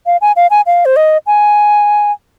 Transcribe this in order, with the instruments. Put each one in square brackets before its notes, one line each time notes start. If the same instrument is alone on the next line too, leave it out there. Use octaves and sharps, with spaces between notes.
[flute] F5
G#5
F5
G#5
F5
C5
D#5
G#5